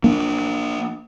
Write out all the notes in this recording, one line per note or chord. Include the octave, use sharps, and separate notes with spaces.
A#3 D4